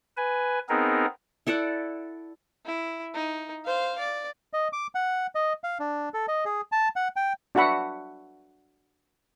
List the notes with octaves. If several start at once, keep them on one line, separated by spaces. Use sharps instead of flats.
B4 G#5
B3 C4 D#4 G#4 A#4
E4 A4 D5 F#5
E4
D#4
C5 F5
D5
D#5
D6
F#5
D#5
F5
D4
A4
D#5
G#4
A5
F#5
G5
D4 F#4 E5 F#5 B5